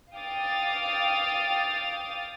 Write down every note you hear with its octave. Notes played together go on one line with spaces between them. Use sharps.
F5 G5 D6 D#6 A6